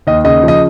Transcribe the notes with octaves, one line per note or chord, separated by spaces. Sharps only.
D#2 D#5
C#3 D#5
F3
D#5